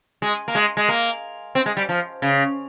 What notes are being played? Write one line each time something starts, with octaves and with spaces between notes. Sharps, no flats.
G#3
A#3
G#3
G#3
A#3
C4
G#3
G3
F3
C#3